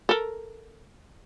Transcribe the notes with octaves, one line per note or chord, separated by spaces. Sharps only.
A4 A#4